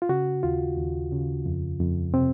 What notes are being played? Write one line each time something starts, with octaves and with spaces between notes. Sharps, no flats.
F4
C#3 F#4
D#2 F4
D#2
C#3
F2
F2
C3 C4